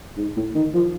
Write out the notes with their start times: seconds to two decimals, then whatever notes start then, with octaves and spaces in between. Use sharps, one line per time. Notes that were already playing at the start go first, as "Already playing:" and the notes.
0.17 G#2
0.36 A2
0.55 D#3
0.74 F3